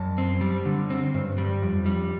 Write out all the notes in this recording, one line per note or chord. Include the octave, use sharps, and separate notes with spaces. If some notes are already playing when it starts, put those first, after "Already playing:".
Already playing: F#2 A5
C4
G3
D3
C4
G2
G3
F2
G3